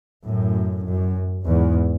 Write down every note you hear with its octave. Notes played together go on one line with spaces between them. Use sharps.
F#2 A2
F#2
E2 G#2